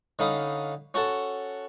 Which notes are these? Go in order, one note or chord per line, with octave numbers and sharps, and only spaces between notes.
D3 C#4 D#4 F5 B5 D#6
C#4 F#4 A4 F#5 A5